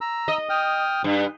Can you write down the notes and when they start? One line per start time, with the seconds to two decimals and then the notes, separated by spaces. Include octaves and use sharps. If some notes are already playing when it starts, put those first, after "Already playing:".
0.01 A#5 E6
0.28 D#5
0.49 G5 D#6 F6
1.04 G2